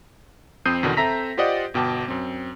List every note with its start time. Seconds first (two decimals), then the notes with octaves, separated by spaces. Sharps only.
0.66 F2 C4 D#6 G6 C7 D#7
0.83 E2 B2 D3 D#3
0.97 C4 A4 E5 A#5 A#6 B6
1.37 F4 G4 C5 D5 D#5 F#5
1.74 G1 B2 G5 A5 D6
2.08 F#2 C4